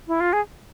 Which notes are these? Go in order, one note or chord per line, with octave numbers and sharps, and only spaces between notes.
E4
F4
G#4